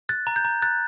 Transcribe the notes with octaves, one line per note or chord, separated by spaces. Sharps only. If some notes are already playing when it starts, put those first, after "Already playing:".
F#6 A6
A#5
G6
A#5
F#6 A6